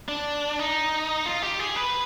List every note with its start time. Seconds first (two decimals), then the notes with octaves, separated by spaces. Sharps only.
0.08 D4
0.59 D#4
1.26 F4
1.42 G4
1.59 G#4
1.76 B4